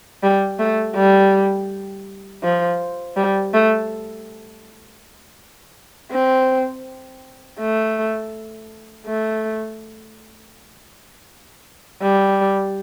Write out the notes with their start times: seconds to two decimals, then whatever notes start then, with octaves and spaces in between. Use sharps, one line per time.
0.23 G3
0.59 A3
0.96 G3
2.43 F3
3.17 G3
3.54 A3
6.12 C4
7.59 A3
9.07 A3
12.02 G3